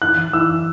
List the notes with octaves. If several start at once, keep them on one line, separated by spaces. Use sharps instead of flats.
E3 F#6
E3
E3 E6